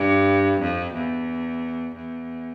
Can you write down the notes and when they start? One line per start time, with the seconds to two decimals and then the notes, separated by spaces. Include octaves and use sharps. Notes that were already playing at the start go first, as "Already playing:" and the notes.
Already playing: G2
0.60 F2
0.94 E2
1.95 E2